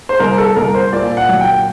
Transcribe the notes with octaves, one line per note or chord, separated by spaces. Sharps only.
C5
C2 A#4
A4
C2 A#4
C5
A#2 D5
F#5
F#3
G5